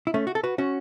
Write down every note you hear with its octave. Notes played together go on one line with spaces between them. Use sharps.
E4
A3 C#4
F#4
A4
F#4 B4
C#4 F#4